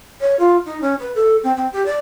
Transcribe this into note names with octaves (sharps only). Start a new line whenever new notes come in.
C#5
F4
D#4
C#4
B4
A4
C4
C4
G4
D5